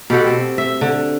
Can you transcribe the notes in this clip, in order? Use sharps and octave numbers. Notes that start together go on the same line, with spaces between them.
B2 G4 A4 F#5
C4
E5
D3